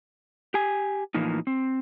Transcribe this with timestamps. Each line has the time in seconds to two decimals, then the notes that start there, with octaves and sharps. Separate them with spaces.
0.54 G4 G#5
1.14 A2 E3 F3 A#3 D#4
1.47 C4